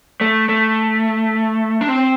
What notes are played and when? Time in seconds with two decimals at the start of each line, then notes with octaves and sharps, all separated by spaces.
0.21 A3
0.49 A3
1.81 D4
1.88 C4